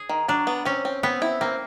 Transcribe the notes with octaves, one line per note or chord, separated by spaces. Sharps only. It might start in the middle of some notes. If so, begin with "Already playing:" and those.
Already playing: G#4
D#3
F#3 D4
B3
C4 C#4
C4
B3 C4
E4
A#3 C4